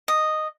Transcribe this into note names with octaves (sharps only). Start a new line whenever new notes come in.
D#5